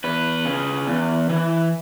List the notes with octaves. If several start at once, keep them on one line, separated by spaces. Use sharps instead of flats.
E2 B4
C#3
E2
E3